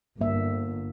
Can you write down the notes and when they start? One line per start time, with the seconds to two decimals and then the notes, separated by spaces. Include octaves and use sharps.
0.21 G1 A#3 E5